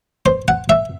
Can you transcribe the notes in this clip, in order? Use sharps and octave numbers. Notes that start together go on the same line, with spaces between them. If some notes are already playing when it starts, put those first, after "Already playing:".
C5
F#5
E5